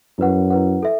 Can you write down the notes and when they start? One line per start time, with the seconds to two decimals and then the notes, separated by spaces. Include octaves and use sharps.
0.18 F#2 E4 B4 F#5
0.50 E4 B4 F#5
0.83 A4 E5